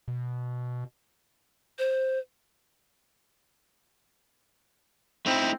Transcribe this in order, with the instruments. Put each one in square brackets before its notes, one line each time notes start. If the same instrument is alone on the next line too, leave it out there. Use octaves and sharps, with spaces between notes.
[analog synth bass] B2
[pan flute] C5
[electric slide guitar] A3 D#4 E4 [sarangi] C4